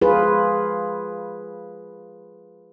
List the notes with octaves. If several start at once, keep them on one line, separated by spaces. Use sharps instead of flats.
F4 G#4 B4